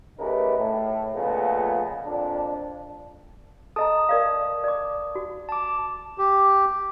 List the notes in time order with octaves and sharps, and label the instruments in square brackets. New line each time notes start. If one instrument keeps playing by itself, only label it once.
[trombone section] C#3 A3 D#4 G4 A#4 B4
A2
A#2 C#3 F3 G#3 A3 B3
F2 A#2 D4
[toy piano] A4 D#5 A#5 [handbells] A5 D#6
[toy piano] A#4 D5 F5
D5 D6
F#4
[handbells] A5 D6
[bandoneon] G4